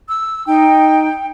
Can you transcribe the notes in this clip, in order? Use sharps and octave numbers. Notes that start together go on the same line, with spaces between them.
E6
D#4 G5